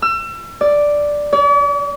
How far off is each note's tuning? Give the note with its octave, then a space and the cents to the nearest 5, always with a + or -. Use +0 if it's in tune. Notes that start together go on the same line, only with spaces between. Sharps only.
E6 +35
D5 +0
D5 -45